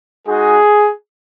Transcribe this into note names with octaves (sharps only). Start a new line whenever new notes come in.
G#3 D#4 F#4 G#4